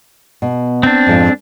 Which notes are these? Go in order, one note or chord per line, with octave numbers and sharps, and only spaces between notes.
B2
C4 D4
F2 G#2 F3